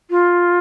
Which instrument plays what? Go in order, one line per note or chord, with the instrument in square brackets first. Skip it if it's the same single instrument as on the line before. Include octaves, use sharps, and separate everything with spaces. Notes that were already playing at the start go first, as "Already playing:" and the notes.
[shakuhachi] F4